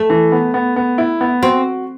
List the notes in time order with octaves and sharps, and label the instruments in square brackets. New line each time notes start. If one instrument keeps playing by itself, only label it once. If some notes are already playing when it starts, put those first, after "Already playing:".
Already playing: [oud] A3
[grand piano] E3
B3
B3
B3
E4
B3
[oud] C4 [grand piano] F#4